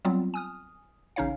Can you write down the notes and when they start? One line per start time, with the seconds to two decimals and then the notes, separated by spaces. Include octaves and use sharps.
0.05 F#3 G3 B3 C4 F4
0.34 G#5 D#6 F6
1.16 A1 C#3 C#4 D#4 C#5 F5